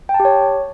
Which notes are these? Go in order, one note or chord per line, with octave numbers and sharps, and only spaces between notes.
G5
A5
G4
C#5